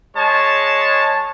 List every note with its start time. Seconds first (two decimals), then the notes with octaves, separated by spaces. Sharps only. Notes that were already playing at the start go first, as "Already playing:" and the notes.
0.16 G#3 C#5 A5